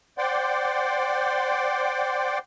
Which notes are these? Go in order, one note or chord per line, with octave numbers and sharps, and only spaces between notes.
C5 D5 F#5 G5 C6 D6